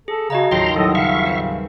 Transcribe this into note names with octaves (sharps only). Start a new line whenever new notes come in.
G#4 A4
C#3 F#4 D#5 A5 A#5
A1 D#2 F#3 C#4 F4 G5 A#5 C6
A2 F#3 G3 A4 D#5
C#3 E5 F5 C#6
C4 G#4 B4